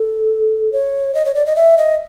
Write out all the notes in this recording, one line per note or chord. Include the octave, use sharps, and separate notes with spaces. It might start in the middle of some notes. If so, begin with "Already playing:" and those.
Already playing: A4
C#5
D#5
C#5
D5
D#5
E5
D#5